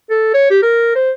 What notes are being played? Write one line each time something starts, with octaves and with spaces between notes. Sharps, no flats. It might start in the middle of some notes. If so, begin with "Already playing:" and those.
A4
C#5
G4
A#4
C5